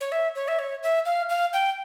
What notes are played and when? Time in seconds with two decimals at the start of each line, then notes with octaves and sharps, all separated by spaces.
0.01 C#5
0.12 E5
0.35 C#5
0.48 E5
0.59 C#5
0.83 E5
1.06 F5
1.29 F5
1.53 G5